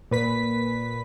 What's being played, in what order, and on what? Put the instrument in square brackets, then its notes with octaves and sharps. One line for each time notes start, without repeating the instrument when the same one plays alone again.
[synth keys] A#2 B4 B6